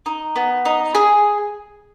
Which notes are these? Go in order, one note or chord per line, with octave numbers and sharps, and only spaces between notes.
D#4
B3
D#4
G#4